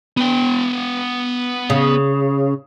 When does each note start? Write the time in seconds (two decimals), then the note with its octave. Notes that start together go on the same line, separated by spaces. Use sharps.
0.17 B3 G5
1.70 C#3